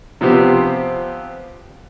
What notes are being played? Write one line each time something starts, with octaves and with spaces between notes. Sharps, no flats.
C3 F3 B3 C4 G4